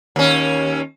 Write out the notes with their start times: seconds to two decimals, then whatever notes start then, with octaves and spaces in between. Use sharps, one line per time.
0.16 D#2 C#4